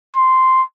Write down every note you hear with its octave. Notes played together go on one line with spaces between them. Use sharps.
C6